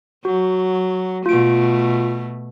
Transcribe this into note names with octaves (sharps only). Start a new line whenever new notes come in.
F#3 F#4
B2 A3 F4 D7